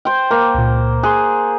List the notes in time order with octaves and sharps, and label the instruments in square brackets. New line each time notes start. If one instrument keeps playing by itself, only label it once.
[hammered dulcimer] C5 G5
A#3
[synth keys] C#2 A#2
[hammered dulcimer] G#4 [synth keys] C6 F#6